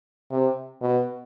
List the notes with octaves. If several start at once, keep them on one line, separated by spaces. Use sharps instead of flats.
C3
B2